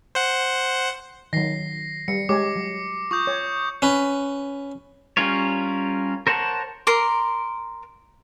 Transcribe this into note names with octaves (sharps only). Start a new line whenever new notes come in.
C5 F#5
D#3 F#3 A#6 C7
G3 C#7
G#3 G4 C#5 D6
F#3
F4 C#6 D#6 G6
C#5
C#4 B4
G3 C#4 F4 A#4 C#5
A#4 C5 C#5 F#5 A5
A#4 C6 D6